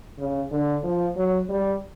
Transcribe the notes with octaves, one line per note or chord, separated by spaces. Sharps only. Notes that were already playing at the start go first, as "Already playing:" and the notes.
C#3
D3
F3
F#3
G3